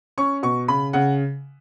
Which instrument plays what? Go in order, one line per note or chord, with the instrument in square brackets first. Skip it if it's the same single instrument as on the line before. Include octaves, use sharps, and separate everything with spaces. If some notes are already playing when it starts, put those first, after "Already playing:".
[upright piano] C#4 C#6
B2 C#6
C#3 B5
C#3 F#5